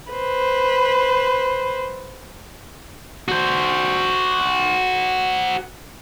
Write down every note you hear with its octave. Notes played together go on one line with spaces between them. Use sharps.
B4 C5
F#4 C5